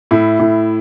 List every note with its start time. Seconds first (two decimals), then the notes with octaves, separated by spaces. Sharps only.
0.11 A2 E4
0.39 A2